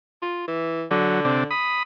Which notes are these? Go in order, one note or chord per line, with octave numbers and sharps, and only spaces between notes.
F4
E3
D3 F#3
C3 D4
B5 D#6